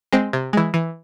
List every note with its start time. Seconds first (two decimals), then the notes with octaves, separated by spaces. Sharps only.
0.12 G#3 C4
0.33 C3
0.53 E3 G#3
0.74 E3